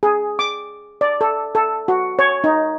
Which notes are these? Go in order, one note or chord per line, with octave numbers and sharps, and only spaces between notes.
G#4
D6
D5
A4
A4
F#4
C#5
D#4